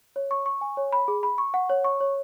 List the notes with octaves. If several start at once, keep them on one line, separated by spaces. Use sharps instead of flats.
C#5
C#6
C#6
G#5
C#5
B5
G#4
B5
C#6
F#5
C#5
C#6
C#5